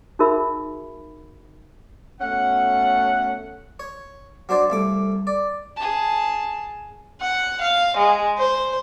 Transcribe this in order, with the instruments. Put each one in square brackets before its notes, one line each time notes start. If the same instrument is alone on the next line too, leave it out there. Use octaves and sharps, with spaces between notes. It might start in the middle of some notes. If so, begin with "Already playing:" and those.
[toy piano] D#4 F#4 G#4 A#4 E5 B5
[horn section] B2 A3 C#4 F#5
[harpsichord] C#5
F#3 D4 C5 D5
C2 A3 D6
D5
[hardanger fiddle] G#4 A5
[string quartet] F#5
F5
G#3
C5